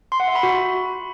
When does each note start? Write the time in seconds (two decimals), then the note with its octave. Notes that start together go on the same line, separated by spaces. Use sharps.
0.12 C6
0.20 F#5
0.28 E5
0.35 B5
0.43 F#4